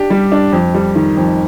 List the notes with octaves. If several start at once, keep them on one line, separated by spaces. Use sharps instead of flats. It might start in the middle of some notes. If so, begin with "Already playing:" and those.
Already playing: D4 G4
G3
D4
F2
G3
D#3
F2